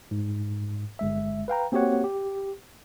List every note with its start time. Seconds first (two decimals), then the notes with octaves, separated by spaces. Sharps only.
0.11 G#2
0.99 G1 G#3 E5
1.48 B4 F5 G5 A#5
1.72 A#3 C4 F#4 G4 C#5 F#5
2.04 G4